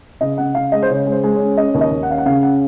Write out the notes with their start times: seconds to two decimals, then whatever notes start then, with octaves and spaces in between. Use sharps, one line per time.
0.21 C#3 D#5
0.38 C#3 F#5
0.55 C#3 F5
0.72 G#3 D#5
0.82 C5
0.89 C#3 C#5
1.06 G#3
1.12 C5
1.23 G#3
1.35 C#5
1.40 C#4
1.57 C#4 D#5
1.74 D#2
1.81 D#5
1.91 D#2
2.03 F#5
2.09 C#4 F5
2.18 F#5
2.26 C#3 F5
2.43 C#4 F#5